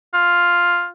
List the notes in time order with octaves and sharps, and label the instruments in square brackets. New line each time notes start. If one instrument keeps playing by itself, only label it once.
[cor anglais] F4